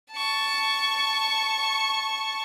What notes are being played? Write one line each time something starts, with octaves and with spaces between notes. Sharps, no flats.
A5 C#6